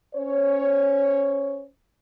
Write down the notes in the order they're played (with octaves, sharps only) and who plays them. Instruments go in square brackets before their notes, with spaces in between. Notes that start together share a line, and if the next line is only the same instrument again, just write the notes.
[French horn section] C#4 C5 C#5